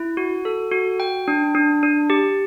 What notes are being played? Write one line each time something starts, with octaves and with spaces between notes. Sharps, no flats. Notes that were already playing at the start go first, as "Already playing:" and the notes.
Already playing: E4
F#4
A4
F#4
G5
D4
D4
D4
G4